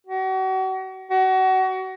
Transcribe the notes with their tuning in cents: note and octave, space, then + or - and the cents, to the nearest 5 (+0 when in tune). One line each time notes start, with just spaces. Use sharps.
F#4 +40
F#4 +30